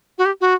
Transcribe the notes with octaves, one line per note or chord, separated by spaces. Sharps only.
F#4
G4
F#4